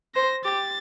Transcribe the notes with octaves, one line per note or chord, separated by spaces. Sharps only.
C5 A#6
G4 A6